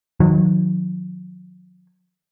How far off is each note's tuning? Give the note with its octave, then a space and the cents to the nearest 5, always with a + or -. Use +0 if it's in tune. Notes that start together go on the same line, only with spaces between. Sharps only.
D#3 +0 F#3 -35